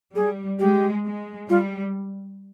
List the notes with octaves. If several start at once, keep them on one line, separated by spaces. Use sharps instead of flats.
G3 G#4
G#3 G4
G#3
G3 F4